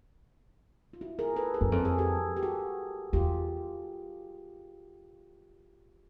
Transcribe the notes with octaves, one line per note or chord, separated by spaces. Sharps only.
F4
E4 F#4
G#4 A#4
A4 B4
G#4 A#4
F#2
F2 A4
G#4
G4 A4
G4
F#4 G#4
E2 F4 G4